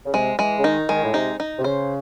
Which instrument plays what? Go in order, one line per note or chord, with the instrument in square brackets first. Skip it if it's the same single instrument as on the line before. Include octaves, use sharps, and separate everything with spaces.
[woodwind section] C#3
[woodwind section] C3 [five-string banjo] G#3
[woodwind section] E3 [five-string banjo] G#3
[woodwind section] C#3
[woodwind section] D#3 [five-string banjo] D#4
[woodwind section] D#3 [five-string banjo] G#3
[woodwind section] A2
[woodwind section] C3 [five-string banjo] D#4
[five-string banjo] D#4
[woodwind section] C3
[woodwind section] C#3 [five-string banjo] C5